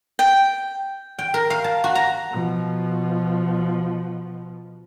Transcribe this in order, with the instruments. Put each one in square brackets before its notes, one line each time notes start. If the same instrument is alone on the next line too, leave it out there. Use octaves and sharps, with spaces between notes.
[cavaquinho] G5
[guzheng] G5
A#4
F5
A5
F#4
A#5
[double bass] B2 F3